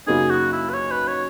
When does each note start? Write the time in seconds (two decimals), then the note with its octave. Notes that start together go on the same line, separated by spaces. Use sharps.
0.07 F#2 C#3 F#3 A#3 D#4 G#4
0.30 F#4
0.52 E4
0.70 B4
0.74 C#5
0.91 B4
1.08 C#5